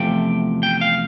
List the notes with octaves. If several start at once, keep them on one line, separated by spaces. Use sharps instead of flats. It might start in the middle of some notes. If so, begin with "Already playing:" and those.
Already playing: E2 C3 F3 A3 G5
G5
F5